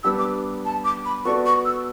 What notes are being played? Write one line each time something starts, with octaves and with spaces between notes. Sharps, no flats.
G3 B3 D4 G4 E6
D6
A5
D6
B5
B3 F#4 A4 D5 C#6
C#6
E6